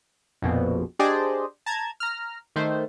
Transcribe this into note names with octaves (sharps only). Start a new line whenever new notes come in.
A#1 F2 B2
D4 G4 G#4 C5 D5 D#5
A5 A#5 G#6
A#5 F6
D#3 A3 C5